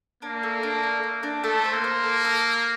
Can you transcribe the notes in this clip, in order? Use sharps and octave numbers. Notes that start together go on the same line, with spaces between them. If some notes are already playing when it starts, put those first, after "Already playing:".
A#3 D4
A3
D4
A3
A3
D4
A3 A4
C5
A#3
C5
A4
A4